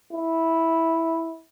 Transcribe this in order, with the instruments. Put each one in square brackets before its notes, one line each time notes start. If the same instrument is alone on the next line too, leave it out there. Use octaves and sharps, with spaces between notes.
[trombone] E4